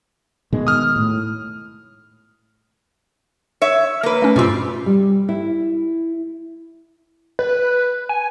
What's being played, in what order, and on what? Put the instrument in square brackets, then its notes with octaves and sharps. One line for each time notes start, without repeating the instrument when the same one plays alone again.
[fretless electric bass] B2 D#3 G#3
[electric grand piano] D#6 F6
[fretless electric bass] A2
[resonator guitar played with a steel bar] C#5 E5
A#3 B4
[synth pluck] A3 C#4
[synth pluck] G2 B2 F4 [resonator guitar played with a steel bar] G3 C4
[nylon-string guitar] G3
E4
[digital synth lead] B4
G#5